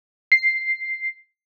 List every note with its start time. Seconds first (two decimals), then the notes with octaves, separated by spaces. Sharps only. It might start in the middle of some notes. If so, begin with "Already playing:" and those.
0.32 C7